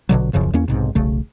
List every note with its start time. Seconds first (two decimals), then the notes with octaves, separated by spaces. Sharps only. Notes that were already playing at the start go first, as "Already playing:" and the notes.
0.09 A#1 B2 D3 F#3
0.33 D1 F#2 C#3 F3
0.53 E2 A#3 C#4
0.68 B1 G#2 C3
0.95 E1 B1 C#3 A3